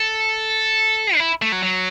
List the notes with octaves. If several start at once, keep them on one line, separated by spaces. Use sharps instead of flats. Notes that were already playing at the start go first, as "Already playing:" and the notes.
Already playing: A4
D4
E4
A3
F#3
F#3